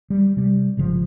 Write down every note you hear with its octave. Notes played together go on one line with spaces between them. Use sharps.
G3
C3 G3
G#1 C#3 F3